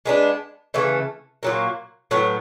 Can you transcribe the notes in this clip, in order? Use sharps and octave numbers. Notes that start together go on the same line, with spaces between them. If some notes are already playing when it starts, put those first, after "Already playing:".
G#3 B3 D4
C#3 E3 A3
A#2 F#3 A#3
A2 F#3 B3